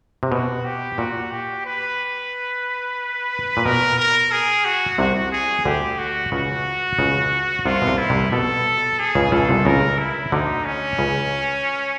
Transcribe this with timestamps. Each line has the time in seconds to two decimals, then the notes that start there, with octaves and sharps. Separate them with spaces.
0.23 C3
0.31 B2 F#4
0.65 G4
0.98 A#2 F#4
1.31 G4
1.65 B4
3.57 A#2
3.65 B2 A#4
3.99 A#4
4.32 G#4
4.65 F#4
4.98 C2 C3 F#4
5.32 G#4
5.65 D2 D3 G4
5.99 F#4
6.32 C#2 C#3 F#4
6.99 C#2 C#3
7.65 C2 C3 F4
7.82 B2
7.88 C2 C3
7.98 E4
8.10 C2 C3
8.32 B2 A4
8.99 G#4
9.15 C#2 C#3
9.32 C#2 C#3 A4
9.49 C2 C3
9.65 C#2 C#3 A#4
9.99 E4
10.32 D2 D3 D#4
10.65 C#4
10.99 C#2 C#3